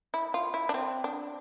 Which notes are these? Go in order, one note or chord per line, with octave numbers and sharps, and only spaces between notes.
E4
F4
E4
D4
C4
D4